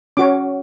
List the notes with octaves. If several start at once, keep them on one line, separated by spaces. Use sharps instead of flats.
C#4 F#4 C#5 D6